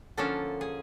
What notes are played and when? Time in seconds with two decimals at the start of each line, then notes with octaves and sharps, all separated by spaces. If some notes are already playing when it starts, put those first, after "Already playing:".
0.17 D3 F3 A#3 C#4 A4
0.61 G#4